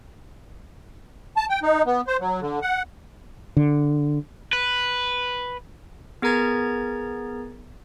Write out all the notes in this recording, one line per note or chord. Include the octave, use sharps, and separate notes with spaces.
A5
G5
D#4
B3
C5
F#3
D3
F#5
D3
B4
B3 G#4 A#4 A#5 G#6 A6